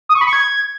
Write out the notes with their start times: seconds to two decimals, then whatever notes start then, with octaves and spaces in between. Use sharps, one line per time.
0.09 D#6
0.15 C#6
0.21 B5
0.27 C#6
0.33 G#6